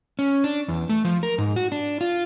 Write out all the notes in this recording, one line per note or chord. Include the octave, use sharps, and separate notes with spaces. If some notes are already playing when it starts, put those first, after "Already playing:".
C#4
D4
E2
A3
F3
A#4
G#2
F#4
D4
F4